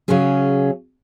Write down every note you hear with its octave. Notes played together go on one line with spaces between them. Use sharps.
C#3 F#3 C#4 G#4